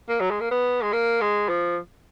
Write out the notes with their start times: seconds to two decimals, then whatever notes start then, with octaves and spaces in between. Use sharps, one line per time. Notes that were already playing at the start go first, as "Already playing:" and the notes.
0.09 A#3
0.20 F#3
0.30 G#3
0.40 A#3
0.51 B3
0.83 G#3
0.92 A#3
1.21 G#3
1.49 F3